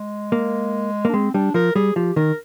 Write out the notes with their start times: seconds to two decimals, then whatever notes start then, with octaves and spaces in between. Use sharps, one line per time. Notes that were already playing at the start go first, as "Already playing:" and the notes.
Already playing: G#3
0.32 A#3
1.05 A#3
1.09 D4
1.14 G#3 C4
1.34 G3 D4
1.54 F3 A#4
1.75 G3 G#4
1.95 F3 G4
2.16 D#3 A#4